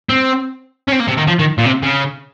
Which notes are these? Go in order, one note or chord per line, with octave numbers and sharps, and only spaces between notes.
C4
C#4
C4
A#3
C3
D#3
F3
D#3
A#2
C3
C#3